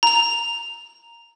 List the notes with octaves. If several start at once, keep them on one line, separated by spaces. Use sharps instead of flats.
A#5 F7